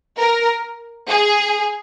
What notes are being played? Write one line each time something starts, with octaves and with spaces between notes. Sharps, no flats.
A#4
G#4